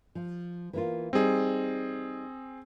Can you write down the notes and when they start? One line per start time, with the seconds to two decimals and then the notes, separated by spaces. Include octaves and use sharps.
0.15 F3
0.73 E3 A#3 F4
1.13 G3 C4 D#4 G#4